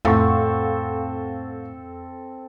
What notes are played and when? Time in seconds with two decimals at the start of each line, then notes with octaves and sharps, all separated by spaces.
0.05 F2 A2 C4 A4 F5 F#5 C#6